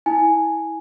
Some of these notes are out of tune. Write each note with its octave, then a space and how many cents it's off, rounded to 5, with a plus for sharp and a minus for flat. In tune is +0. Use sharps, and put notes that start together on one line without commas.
E4 -20 G#5 +0